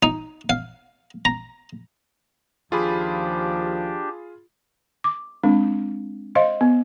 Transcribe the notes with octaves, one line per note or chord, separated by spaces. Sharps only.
D#4
F5
A#5
D#2 F3 D4 F4 G4 G#4 B5
D6
G#3 C4 D4
C5 D#5 F5 C6
B3